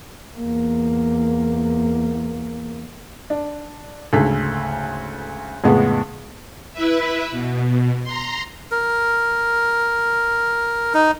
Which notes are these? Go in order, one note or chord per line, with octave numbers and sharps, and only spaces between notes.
E2 A#3
D4
D2 G#2 C#3 A4 B6
F2 A2 C#3 G#3 B3
E4 B4 E5
B2
A#5 C6
A#4
D#4